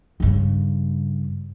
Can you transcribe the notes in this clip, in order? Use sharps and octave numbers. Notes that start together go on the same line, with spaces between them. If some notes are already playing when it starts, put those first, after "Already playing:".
G2 C#3